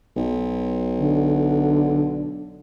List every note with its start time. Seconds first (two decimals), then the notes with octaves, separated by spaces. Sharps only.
0.16 B1
1.00 D3